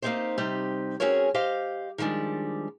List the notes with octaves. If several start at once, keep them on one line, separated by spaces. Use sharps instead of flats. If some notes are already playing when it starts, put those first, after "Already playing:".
A#3 C4 D4 D#4 G4 C5
C3 G3 C4 D#4 G4
C4 C#4 F#4 G#4 A#4 C#5
G4 C5 D#5 F5
D#3 F3 G3 G#3 D4